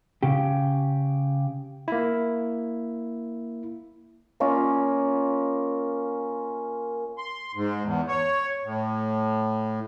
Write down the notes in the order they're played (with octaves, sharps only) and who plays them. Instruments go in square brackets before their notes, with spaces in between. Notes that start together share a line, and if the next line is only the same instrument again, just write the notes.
[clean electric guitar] C#3 G4
[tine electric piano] A#3 E4
[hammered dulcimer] A#3 C#4 F4 D#5
[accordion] C6
G#2
E2
C#5
A2